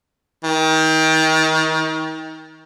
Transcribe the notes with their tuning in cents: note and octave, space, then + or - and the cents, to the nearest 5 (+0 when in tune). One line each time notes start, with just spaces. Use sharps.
D#3 +30